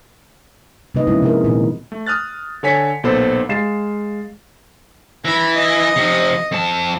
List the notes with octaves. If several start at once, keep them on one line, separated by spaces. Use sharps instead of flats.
C3 A#3 D#4 B4 D#5
F3 G#3 C#4 E4
C3 G#4 A#4
A#2 D#3 E3 F4
A3
D#6 F6 F#6 A6
D3 A4 C#5 G#5 B6 C#7
B1 A#2 B3 A4 C5 B5
G#3 F5 A6 C7 E7
E3 A#5 B5
D#5
C3 F3
F2 A5